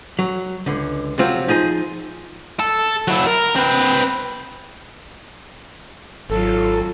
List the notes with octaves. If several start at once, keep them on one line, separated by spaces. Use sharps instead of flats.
F#3
C#2 D3
C3 F3 F#3 C4 F4
F3 D#4 G#4 C5
A4
F#3 E4
A#4
C4 B4
G#1 F#3 F4 A4